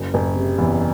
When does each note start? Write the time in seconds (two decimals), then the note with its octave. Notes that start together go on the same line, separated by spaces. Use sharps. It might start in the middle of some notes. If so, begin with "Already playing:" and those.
Already playing: F#1
0.14 F#1
0.36 C3
0.58 E2